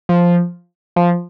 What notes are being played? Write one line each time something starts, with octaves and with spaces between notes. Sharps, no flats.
F3
F3